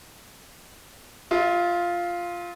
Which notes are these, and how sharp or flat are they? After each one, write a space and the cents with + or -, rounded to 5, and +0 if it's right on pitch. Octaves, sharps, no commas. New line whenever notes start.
F4 +0 E5 -45